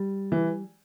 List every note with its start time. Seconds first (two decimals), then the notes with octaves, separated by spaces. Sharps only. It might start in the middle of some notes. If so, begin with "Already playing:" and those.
Already playing: G3
0.32 E3